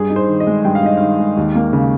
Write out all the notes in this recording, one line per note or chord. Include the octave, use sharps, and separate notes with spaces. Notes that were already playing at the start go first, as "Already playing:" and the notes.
Already playing: G2 G#4
D#4
C5
D#3
D#5
G#3
G2 G5
F5
D#4 D#5
D#3 F5
G#3
D#2
A#3
C#3